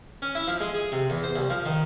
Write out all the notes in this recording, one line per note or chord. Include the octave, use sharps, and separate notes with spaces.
C#4
E4
F3
G#3
G#4
C3
E2
C5
C2
F3
D#3